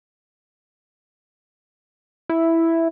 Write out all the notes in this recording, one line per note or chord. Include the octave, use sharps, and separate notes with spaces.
E4